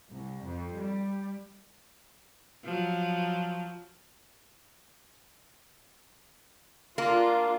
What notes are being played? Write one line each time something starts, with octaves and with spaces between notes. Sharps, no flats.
C2
F2
G3
F3 F#3
A#3 D4 F4